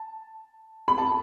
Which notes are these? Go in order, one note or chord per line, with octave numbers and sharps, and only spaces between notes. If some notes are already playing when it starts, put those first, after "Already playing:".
Already playing: A5
B5
A5